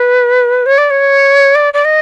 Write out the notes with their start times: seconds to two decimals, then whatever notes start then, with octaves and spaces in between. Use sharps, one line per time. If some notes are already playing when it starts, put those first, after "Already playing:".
Already playing: B4
0.66 C#5
0.78 D5
0.90 C#5
1.55 D5
1.74 D5
1.85 D#5